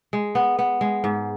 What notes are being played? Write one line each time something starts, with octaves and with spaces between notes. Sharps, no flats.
G#3
B3
B3
G#3
G#2